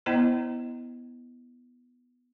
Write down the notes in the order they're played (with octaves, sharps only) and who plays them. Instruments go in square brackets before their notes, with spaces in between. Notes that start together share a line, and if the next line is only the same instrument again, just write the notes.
[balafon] B3 E4 C5 D#5 G5 A#5